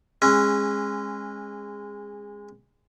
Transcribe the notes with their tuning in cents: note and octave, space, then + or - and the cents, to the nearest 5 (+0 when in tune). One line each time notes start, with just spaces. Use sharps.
G#3 -15 C#4 -30